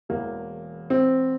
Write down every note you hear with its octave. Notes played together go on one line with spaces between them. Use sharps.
E1 E2 E3 A#3
C4